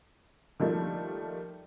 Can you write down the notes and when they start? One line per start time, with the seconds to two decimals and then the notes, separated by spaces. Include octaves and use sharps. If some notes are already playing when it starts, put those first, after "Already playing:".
0.60 D#3 F3 G3 A3 A#3